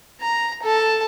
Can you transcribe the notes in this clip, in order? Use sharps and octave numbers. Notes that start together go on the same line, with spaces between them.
A#5
A4 A5